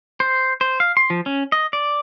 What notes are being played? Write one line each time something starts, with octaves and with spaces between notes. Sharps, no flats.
C5
C5
F5
C6
F3
C#4
D#5
D5